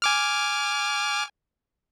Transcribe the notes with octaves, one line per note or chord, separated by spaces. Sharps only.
G#5 D6 F6